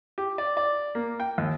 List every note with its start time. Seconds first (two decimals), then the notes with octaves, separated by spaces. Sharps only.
0.18 G4
0.38 D5
0.57 D5
0.95 A#3
1.20 G5
1.38 D#2